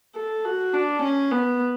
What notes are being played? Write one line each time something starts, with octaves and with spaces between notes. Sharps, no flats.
A4
F#4
D4
C#4
B3